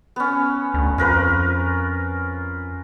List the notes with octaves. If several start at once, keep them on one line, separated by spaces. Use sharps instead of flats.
B3 C#4
D2
F2 F4 A#4 B4